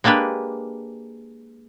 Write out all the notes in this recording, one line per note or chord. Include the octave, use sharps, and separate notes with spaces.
G#3 A#3 D4 G4 B4